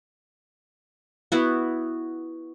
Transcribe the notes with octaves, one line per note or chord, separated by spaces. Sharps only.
B3 E4 F#4